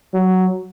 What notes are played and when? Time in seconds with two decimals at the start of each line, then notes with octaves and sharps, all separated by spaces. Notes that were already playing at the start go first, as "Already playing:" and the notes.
0.14 F#3